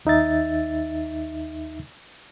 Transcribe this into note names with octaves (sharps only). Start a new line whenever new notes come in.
D#2 D#4 E5 A6